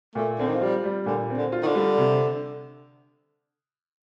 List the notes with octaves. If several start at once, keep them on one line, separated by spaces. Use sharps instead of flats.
A#2 A3
D3 C4
D#3
F3
G3 F4
G3
A#2 D3
C4
D3
F4
D#3
D3
G3
C3